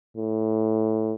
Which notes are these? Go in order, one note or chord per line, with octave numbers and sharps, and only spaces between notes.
A2